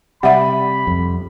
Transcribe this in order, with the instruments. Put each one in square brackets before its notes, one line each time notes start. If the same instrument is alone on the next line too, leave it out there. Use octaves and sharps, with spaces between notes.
[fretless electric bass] C3 [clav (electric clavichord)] G3 D5 [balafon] E5 F#5 [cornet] B5
[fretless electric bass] F2